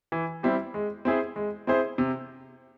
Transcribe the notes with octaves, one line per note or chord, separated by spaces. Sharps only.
E3
G3 C4 E4 G4
G#3
C4 E4 G#4 C5
G#3
C4 E4 G#4 C5
C3